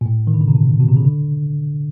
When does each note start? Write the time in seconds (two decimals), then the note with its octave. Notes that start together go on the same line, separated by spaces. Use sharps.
0.01 A#2
0.06 A2
0.27 D#3
0.34 D3
0.41 C#3
0.48 C3
0.55 B2
0.80 B2
0.88 C3
0.96 C#3
1.05 D3